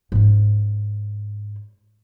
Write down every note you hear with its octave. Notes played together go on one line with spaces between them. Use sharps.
G#2 C#4